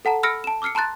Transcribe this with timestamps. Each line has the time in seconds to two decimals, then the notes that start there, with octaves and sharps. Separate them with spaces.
0.05 A4 F#5 A5 A#5
0.23 B5 E6 F6 A#6 C#7 D7
0.44 A5 E7
0.62 D6 E6 F6 C7 C#7
0.75 A5 A#5 C6 F#6 A6